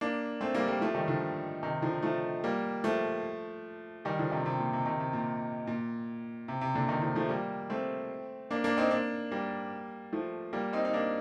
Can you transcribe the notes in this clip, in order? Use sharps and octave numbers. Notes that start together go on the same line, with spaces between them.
A#3 D4
A3 C4
G3 A#3
G3 A#3
F3 A3
D#3 G3
D3 F3
C3 D#3
D3 F3
F3 A3
G3 A#3
F3 A3
D#3 G3
D3 F3
C3 D#3
C3
A#2
C3
C3 D#3
C3
A#2
A#2
C3
C3
A#2 D3
C3 D#3
D3 F3
F3 A3
G3 A#3
A3 C4
A#3 D4
A#3 D4
C4 D#4
A#3 D4
G3 A#3
F3 A3
G3 A#3
C4 D#4
D#4
A#3 D4